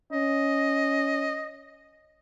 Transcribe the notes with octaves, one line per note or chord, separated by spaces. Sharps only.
C#4 D#5